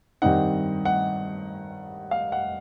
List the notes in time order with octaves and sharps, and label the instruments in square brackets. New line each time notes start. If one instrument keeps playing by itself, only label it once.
[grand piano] G2 D#3 G3 C4 D#4 F#5
F#5
F5
F#5